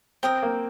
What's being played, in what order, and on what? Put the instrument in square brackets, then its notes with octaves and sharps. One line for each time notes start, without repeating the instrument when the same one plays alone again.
[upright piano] C4 [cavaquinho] A#4 G5 D#6
[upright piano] A#3